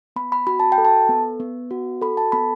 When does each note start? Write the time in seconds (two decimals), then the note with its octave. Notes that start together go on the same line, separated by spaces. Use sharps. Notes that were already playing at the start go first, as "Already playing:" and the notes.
0.16 B3 B5
0.32 B5
0.47 F#4 B5
0.60 A5
0.72 G5
0.78 A4
0.85 A5
1.09 B3
1.40 B3
1.71 F#4
2.02 A4 B5
2.17 A5
2.32 B3 B5